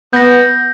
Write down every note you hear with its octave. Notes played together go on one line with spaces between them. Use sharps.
B3 G6 A#6